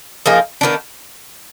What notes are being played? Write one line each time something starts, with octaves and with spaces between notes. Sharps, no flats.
F3 A#3 D#4 G#4
D#3 G3 B3 D4